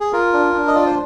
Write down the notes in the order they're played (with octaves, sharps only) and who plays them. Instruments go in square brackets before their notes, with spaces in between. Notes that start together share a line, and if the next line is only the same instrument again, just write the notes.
[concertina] G#4
F4 A#4
D4
D4
D#5
F4 D5
C5